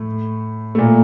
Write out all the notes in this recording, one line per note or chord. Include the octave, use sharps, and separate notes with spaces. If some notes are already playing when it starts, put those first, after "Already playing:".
Already playing: A2 A3
A3
A#2 A#3